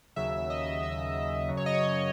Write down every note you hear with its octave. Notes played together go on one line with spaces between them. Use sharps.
D#2 C#3 F#3 E5
D#5
E5
F#2 C#3 F#3
C#5
D#5
C#5